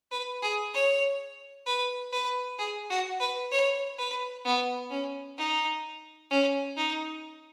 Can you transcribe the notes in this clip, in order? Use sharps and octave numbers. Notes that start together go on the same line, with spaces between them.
B4
G#4
C#5
B4
B4
G#4
F#4
B4
C#5
B4
B3
C#4
D#4
C#4
D#4